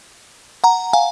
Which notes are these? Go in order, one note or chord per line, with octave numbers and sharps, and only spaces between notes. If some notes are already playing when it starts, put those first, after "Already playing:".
F#5 A#5
F5 G#5